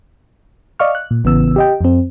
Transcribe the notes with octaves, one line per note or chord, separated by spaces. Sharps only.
D5 D#5 F5 C#6 F6
F#6
A#2
A1 C#3 E3 B3 E6
G4 D#5 G5
F2 C4